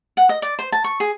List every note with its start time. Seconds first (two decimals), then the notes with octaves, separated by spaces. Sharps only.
0.17 F#5
0.29 D#5
0.42 D5
0.59 C5
0.72 A5
0.84 C#6
1.00 G#4